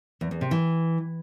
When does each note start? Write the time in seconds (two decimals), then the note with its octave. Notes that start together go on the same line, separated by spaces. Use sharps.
0.21 E2
0.31 E2
0.41 C3
0.51 E3